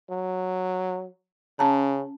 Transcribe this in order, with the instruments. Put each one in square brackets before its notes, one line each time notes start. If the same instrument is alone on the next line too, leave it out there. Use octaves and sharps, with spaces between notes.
[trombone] F#3
[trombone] C#3 [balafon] C#4 A5 A#5